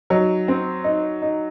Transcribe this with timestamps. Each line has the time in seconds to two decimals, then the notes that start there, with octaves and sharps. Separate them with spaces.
0.10 F#3 D#4
0.48 C4
0.84 D#4
1.22 D#4